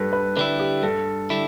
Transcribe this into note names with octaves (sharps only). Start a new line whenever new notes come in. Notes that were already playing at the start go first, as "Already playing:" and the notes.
Already playing: G2 G4 A4 B4
B4
D3 G3 E4 B4
G4
G2 A4
D3 G3 E4